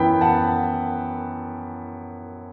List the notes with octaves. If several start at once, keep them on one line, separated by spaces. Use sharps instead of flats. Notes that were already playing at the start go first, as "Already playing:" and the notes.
Already playing: F#2 E3 B3 E4 G5 B5
F#5 A5